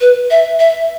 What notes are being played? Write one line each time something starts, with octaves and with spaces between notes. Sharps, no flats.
B4
E5
E5